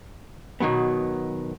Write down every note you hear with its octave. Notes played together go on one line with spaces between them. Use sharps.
B2 D#3 F#3 B3